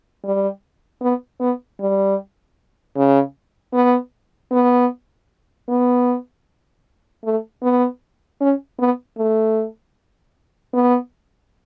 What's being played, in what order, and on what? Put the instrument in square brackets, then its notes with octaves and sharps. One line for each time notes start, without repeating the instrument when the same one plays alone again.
[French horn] G3
B3
B3
G3
C#3
B3
B3
B3
A3
B3
C#4
B3
A3
B3